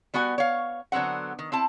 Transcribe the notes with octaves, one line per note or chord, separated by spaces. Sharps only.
G3 B3 F#4 F#5 G#5
C#5 F5
D3 F#3 B3 C4 F#5
D#3
C4 E4 A5